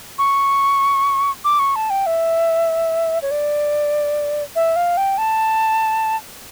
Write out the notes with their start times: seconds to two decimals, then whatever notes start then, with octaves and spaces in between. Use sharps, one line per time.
0.19 C#6
1.44 D6
1.59 C#6
1.76 A5
1.90 G5
2.06 E5
3.22 C#5
3.31 D5
4.56 E5
4.76 F5
4.97 G5
5.18 A5